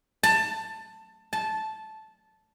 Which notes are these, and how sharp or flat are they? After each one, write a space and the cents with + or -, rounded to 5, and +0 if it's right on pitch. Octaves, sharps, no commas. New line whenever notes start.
A5 +15
A5 -10